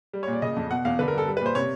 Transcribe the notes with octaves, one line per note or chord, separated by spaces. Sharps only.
G3
C#5
A#2
D5
C#3 D#5
F2
B2 F#5
E2 F5
D3 B4
A#4
G2
A4
G3
B4
A#2 C5
C3 C#5